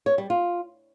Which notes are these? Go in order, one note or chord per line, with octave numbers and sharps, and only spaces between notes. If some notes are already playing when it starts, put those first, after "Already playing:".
C#5
G3
F4